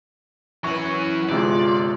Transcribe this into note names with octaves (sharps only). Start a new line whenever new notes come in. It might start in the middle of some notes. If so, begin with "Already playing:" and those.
E3 F#3 C#4 F#5 C#6
G1 C3 G#3 F4 D5